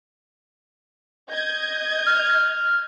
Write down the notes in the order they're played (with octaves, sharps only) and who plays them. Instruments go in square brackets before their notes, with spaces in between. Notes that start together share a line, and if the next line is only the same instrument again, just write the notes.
[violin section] D#5 G6 G#6
[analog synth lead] F6